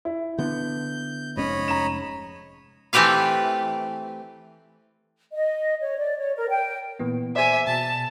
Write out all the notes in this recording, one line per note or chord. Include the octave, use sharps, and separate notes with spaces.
E4
D3 B3 G6
F1 G#2 C#4 C#5 D#5 B5
A#5 E7
E3 A3 C4 G4 B4 F5
D#5
C#5
D5
C#5
A#4
G5
A#2 E3 B3
G#4 C5 D5 E5 G#5
B2 A5